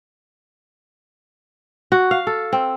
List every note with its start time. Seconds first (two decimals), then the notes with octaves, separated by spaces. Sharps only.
1.92 F#4
2.11 F5
2.27 A4
2.53 C4